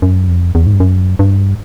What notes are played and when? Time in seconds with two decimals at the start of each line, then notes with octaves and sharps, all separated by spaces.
0.02 F#2
0.28 F2
0.55 E2
0.66 G#2
0.73 G2
0.80 F#2
1.19 G2